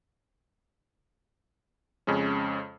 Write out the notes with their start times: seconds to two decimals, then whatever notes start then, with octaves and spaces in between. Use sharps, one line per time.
2.07 F2 C#3 G#3 C#4